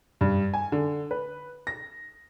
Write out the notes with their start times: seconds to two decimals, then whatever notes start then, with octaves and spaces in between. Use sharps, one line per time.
0.21 G2
0.54 G#5
0.72 D3
1.11 B4
1.67 A#6